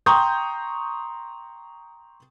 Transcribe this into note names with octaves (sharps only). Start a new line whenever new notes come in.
G5 A#5 C6 C#6 D#6 G6